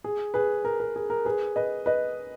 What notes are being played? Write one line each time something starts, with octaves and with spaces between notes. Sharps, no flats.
G#4
G#4 B4
A#4
A#4
G#4
A#4
G#4 B4
B4 D#5
B4 D#5